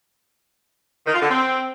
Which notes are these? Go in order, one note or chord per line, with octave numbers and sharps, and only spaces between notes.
D#3
F4
D3
C4